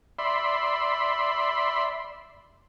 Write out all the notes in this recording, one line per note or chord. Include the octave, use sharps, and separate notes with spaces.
D5 E5 B5 C6